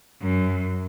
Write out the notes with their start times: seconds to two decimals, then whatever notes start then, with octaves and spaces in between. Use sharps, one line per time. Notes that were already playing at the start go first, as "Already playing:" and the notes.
0.22 F#2